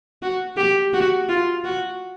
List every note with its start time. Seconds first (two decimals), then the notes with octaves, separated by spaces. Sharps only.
0.22 F#4
0.57 G4
0.93 F#4
1.29 F4
1.65 F#4